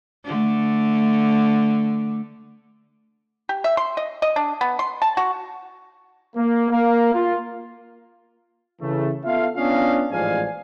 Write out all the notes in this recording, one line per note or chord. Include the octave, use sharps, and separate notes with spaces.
D3 A3
G4
E5
C6
D#5
D#5
D4
B3
C6
A5
F#4
A#3
A#3
F4
C#3 E3 A3
B3 F4 A4 E5 F5
B3 C#4 D4 F4 D#5 F5
A1 G#2 F3 D5 F5 G#5